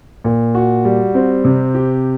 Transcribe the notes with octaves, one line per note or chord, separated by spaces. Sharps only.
A#2
F#4
G3
C4
C3
G4